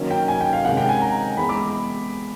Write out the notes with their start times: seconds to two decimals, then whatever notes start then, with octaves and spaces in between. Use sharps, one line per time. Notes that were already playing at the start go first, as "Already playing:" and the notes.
Already playing: D#3 F#3 A#3 C#4
0.11 G5
0.28 G#5
0.41 G5
0.53 F5
0.65 C3 D#3 G#3 C#4 F#5
0.77 G5
0.89 G#5
1.02 A#5
1.37 E3 G#3 B3 B5
1.49 D6